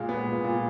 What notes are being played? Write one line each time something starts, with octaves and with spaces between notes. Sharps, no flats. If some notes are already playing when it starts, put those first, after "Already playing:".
Already playing: A#2 G#3 F5
B3
A#2
A#2